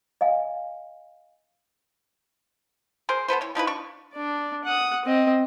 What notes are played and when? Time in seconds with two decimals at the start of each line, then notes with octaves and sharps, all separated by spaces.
0.21 D#5 F5 G#5
3.09 G#4 A#4 C5
3.28 B3 A4 B4 C5
3.41 E3 C#5
3.55 F3 D#4 E4 B4
3.67 D4 C#6
4.14 D4 D5
4.64 F#5 D#6
5.05 C4 D#5